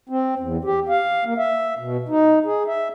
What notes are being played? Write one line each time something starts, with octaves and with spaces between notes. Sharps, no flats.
C4
E2
G4
F5
A#3
E5
B2
D#4
G#4
E5